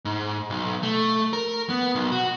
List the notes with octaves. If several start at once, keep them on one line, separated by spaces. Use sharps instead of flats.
G#2
B1
A3
A#4
B3
B1
F#4